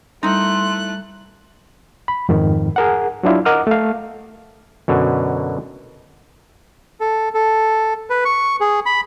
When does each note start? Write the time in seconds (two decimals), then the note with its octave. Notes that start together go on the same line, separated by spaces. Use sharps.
0.23 G3 A3 D#4 E4 C6 F#6
2.08 B5
2.29 F2 G#2 D#3
2.76 G#4 A#4 F#5
3.23 F#3 D4 E4 F4
3.45 A#4 D#5 F#5 D6 D#6 F6
3.67 A3 F5
4.88 F#2 B2 D3
7.00 A4
7.34 A4
8.10 B4
8.25 C#6
8.61 G#4
8.86 B5